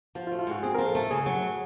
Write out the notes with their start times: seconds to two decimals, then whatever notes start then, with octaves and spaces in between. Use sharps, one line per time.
0.15 F3 F#4
0.27 F4
0.32 A3
0.39 F4
0.47 G#2 F#4
0.63 C4 G#4
0.75 F3 A#4
0.87 A4
0.95 A3
1.11 C#3 G#4
1.26 F#3